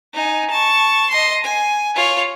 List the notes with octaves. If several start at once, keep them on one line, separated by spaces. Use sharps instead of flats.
D#4 G#5
A5 C#6
D#5 C6
G#5
F4 C#5